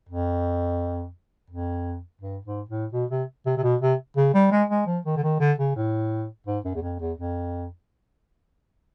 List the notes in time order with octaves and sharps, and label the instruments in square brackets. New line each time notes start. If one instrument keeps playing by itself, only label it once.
[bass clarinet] F2
F2
G2
G#2
A2
B2
C3
C3
C3
B2
C3
C#3
G3
G#3
G#3
F3
D#3
D3
D#3
D3
C#3
A2
G#2
F#2
E2
F2
E2
F2